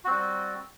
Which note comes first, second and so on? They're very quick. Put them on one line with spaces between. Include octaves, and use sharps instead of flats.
F#4 C4 G3